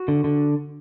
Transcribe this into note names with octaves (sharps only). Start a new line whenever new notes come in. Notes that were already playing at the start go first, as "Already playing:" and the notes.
Already playing: F#4
D3
D3